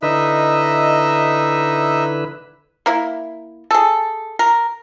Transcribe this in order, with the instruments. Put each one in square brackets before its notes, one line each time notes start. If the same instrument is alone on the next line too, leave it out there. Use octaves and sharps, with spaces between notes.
[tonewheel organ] D3 E4 B4 [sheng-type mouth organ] D#4 D#5 E5
[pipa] A#3 E4
G#4 A4
A#4